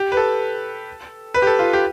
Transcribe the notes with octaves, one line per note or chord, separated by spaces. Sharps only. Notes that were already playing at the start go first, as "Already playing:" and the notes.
Already playing: G4
B4
A4
B4
G4
A4
F4
G4